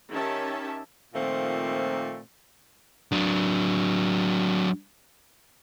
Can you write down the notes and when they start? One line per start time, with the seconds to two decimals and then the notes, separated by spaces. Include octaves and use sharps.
0.12 D#3 C#4 G4 E5 A5
1.14 A#2 D#3 F3 A3 A#3 C4
3.12 F#3 D4